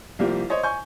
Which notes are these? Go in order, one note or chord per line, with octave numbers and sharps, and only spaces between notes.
C2 F3 A#3 G4
C5 C#5 D#5
G#5 C#6 G6